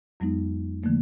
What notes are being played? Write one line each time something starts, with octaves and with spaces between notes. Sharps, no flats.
F2 F#3 G#3 B3 D#4
D3 E3 F3 A3 A#3